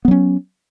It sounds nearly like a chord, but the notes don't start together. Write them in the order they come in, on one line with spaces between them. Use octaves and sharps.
B3 F#3 C#4